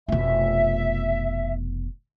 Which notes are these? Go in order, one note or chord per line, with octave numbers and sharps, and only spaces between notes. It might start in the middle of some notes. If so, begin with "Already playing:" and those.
F1 B2 E5